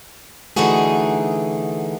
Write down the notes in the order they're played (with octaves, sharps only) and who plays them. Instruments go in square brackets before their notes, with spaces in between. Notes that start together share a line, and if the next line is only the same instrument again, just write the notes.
[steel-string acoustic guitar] D3 E3 A3 D#4 F#4 G#4